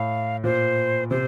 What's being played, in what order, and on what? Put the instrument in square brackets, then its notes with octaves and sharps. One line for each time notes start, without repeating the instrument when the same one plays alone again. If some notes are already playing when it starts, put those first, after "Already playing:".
Already playing: [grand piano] A2 [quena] F5
[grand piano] A#2 [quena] C5
[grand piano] C3 [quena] C5